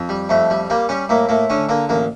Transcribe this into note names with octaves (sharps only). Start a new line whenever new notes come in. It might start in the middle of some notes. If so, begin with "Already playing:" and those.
Already playing: F2
G3
F2 A3
G3
G3 A#3
G3 C#4
A2 A#3
A2 A#3
D3 C#4
D3 A#3
A1 A#3